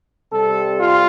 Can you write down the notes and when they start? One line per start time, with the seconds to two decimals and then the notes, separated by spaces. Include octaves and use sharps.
0.31 C3 G3 C4 A4
0.77 F4